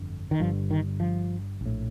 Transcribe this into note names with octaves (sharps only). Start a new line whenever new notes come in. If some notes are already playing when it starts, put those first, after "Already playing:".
Already playing: G1 F2 D3
D#3
G1 G2 D3 F3
D#3
F3
A#1 A2